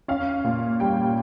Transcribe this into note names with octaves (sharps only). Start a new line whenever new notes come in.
C#4 F5
A#2
G3 G5